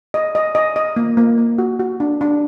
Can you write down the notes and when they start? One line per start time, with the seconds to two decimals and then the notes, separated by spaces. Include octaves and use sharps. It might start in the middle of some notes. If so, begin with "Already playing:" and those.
0.14 D#5
0.35 D#5
0.55 D#5
0.76 D#5
0.96 A#3
1.17 A#3
1.38 A#3
1.58 F#4
1.80 F#4
2.00 D4
2.21 D4